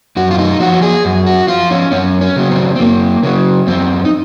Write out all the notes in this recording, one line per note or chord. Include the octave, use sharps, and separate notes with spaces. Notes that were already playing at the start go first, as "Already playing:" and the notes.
F#2 F#4
F4
D#4
F3 F#4
G#4
F#2
F#4
F3 F4
C#4
F#2 C#4
C#4
C#3 F#3
C4
C4
F#2 A#3
C#3 F#3
F#2 C4
D#4